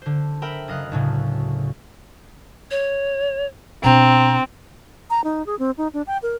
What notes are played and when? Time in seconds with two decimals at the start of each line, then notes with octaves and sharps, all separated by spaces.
0.02 D3 C5
0.42 A#4 E5 G5 B5
0.68 F#1 D#5 F5 F#6
0.92 D2 A2 C#3
2.71 C#5
3.84 B2 C4 D4 A#5
5.10 A#5
5.24 D#4
5.46 G#4
5.59 C4
5.78 D#4
5.94 D4
6.07 G5
6.23 A#4